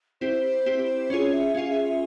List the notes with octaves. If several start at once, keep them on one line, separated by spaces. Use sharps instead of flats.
C4 E4 G4 C5
C4 E4 G4
C#4 F4 G#4 C#5
E5
C#4 F4 G#4 F5
E5
E5